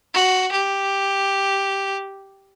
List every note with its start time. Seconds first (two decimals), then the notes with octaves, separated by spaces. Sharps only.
0.14 F#4
0.52 G4